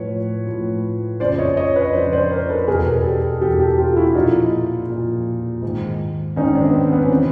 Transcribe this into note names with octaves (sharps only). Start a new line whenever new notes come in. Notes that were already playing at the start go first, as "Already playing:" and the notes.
Already playing: A2 F3 B4 C#5
A2 F3
F2 C#3 F3 C5 D5
C#5 D#5
C#5 D#5
B4 C#5
F2 C#3 F3 C5 D5
C5 D5
A#4 C5
A4 B4
E2 B2 G#4 A#4
G4 A4
E2 B2 G4 A4
G4 A4
F4 G4
E4 F#4
A#2 F3 D#4 F4
A#2 F3
G#2 D#3
G#2 D#3 C#4 D#4
C4 D4
B3
C4
B3
C#4
C3 E3 C4